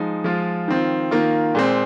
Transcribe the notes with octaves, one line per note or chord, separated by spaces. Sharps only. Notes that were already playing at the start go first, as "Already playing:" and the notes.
Already playing: F3 G#3 D#4
F3 G#3 F4
D#3 C4 F4
D#3 A#3 F4
A#2 G#3 C4